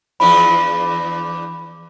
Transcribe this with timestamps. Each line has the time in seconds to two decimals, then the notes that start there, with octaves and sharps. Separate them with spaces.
0.20 E2 F3 D4 B5